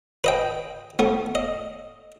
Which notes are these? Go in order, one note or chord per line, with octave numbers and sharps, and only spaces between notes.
B4 D#5 G5
A3 B3
D#5